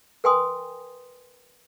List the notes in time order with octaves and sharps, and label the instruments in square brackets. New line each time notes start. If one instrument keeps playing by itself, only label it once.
[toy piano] A#4 B4 G5 G#5 C6 D#6